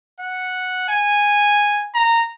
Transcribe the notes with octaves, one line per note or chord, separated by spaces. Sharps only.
F#5
G#5
A#5